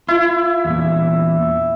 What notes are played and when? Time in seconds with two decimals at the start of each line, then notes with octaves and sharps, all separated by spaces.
0.08 E4 F4
0.65 E2 A#2